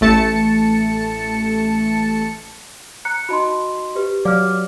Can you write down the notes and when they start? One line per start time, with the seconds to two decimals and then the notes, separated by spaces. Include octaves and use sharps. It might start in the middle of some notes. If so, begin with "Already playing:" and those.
0.01 A1 A3 A5 C#7
3.05 A#5 F#6 C#7
3.29 D#4 F#4 D#5 A5 B5 C6
3.95 G4 B4
4.25 F#3 D5 F5 G#5 D6 F6